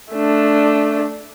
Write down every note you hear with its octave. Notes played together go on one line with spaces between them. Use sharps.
A3 D4